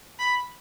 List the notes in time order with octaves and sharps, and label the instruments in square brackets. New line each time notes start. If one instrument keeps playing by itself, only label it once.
[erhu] B5